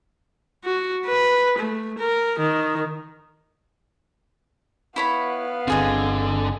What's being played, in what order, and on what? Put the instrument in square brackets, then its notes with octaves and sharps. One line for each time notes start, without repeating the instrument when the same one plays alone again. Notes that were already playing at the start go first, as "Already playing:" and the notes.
[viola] F#4
B4
A3
A#4
D#3
[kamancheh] B3 F5 [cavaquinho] E4 C#5 B5
[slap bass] G1 C4 [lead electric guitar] D3 [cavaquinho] F4 G#4 D#5